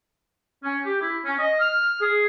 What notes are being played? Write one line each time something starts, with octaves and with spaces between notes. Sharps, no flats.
C#4
G4
E4
C#4
D#5
F6
G#4